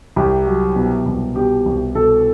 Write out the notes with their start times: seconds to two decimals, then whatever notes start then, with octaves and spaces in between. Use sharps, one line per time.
0.16 C2 G4
0.47 F#3
0.76 B2
1.06 C2
1.36 B2 G4
1.66 C2
1.95 B2 A4